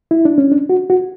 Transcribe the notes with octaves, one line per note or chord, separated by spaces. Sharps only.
E4
D4
C#4
D4
F#4
F#4